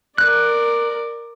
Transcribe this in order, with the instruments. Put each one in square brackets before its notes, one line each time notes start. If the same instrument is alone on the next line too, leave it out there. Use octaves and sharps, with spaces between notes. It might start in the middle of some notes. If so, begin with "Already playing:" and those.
[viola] A#4 D5 [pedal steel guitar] F#6